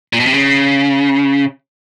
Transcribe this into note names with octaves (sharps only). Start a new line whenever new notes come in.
A#2
B2
C3
C#3